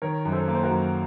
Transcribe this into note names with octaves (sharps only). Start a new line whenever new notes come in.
D#3 A#4 C#5
F#2
A4 C5
A#3
C5
F#4 A#4
F#2